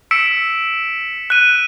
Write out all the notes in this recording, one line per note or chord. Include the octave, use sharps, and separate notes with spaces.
E6 B6 C#7 D7 E7
F#6 D#7